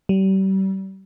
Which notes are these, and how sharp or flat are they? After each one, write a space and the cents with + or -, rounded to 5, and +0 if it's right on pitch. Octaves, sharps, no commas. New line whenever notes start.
G3 -35